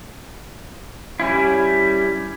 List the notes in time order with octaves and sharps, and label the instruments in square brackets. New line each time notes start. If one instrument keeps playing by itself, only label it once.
[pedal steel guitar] G3 C#4 E4